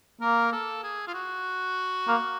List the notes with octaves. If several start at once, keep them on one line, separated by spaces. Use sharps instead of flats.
A#3 A#4
A4
G#4
F4
F#4
A#3